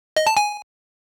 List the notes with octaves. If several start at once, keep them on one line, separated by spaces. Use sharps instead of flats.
D#5
A5
G#5